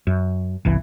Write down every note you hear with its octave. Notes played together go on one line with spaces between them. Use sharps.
F#2
G1 C2 E3